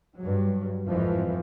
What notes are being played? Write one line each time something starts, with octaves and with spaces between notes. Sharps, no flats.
G2 F#3
G#1 F2 E3 F3